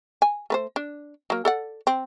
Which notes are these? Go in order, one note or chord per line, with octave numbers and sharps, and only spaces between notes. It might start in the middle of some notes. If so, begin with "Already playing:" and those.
G#5
A3 B4 C5
D4
F#3 A#3
A4 D5 F#5
C4